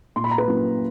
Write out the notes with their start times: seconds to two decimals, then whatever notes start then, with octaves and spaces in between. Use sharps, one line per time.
0.16 A#2 C6
0.24 B5
0.31 A#5
0.38 B4 B5
0.48 F#3 A#3 C#4 E4